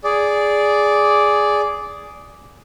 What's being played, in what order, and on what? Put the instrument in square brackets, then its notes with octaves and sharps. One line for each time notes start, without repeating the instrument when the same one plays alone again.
[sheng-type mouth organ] G#4 D5